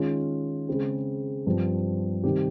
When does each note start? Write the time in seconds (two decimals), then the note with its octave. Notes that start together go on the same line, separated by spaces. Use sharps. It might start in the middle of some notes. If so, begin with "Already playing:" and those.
Already playing: D#3 G#3 C#4 F4
0.68 C#3 G#3 C4
1.47 G2 F3 C4
2.24 C3 D#3 G3 C4 G4